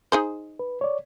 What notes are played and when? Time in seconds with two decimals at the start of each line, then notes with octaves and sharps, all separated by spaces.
0.12 D#4 G#4 C5
0.59 B4
0.81 C#5 D5